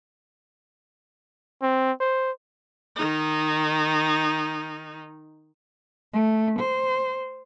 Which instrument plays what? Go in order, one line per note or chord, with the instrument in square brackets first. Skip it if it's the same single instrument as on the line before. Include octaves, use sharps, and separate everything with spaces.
[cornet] C4
C5
[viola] D#3 D#4
[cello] A3
C5